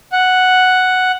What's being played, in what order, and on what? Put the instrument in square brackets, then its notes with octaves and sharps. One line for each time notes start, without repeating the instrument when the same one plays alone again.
[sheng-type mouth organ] F#5